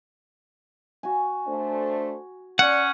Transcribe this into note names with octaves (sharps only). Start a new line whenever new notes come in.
F#4 G#5
A3 D4 C5
C#4 D5 F#5